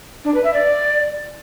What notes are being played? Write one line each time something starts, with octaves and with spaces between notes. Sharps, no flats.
D4
B4
E5
D5